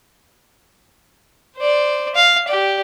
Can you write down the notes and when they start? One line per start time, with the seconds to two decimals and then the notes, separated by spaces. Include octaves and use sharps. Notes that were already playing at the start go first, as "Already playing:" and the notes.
1.57 C5 D5
2.15 F5
2.48 G4 D5